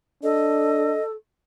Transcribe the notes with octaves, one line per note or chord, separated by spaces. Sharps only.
D4 A4 D#5